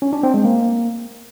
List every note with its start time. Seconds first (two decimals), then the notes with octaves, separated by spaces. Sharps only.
0.02 C#4
0.13 D4
0.23 C4
0.34 G#3
0.45 A#3